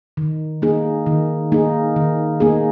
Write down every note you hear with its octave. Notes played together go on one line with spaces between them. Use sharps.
D#3
A#3 D#4 G#4
D#3
A#3 D#4 G#4
D#3
A#3 D#4 G#4